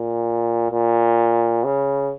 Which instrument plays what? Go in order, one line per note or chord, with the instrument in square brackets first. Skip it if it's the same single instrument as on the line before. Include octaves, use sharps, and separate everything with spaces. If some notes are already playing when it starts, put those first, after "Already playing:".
Already playing: [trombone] A#2
A#2
C#3